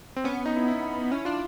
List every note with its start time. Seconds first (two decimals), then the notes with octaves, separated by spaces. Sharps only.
0.16 C4
0.24 B3 C#4
0.46 D#4
0.57 E4
0.68 E4
1.11 C#4 E4
1.25 D4 F4